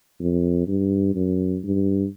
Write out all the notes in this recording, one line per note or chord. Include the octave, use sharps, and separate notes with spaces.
F2
G2
F#2
G2